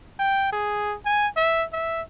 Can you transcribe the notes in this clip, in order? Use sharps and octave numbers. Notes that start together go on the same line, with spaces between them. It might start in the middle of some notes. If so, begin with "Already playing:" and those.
G5
G#4
G#5
E5
E5